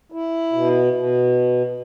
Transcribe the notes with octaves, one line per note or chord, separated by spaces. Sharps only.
E4
B2
B2